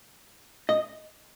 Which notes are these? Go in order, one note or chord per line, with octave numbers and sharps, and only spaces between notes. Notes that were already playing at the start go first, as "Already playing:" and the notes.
D#5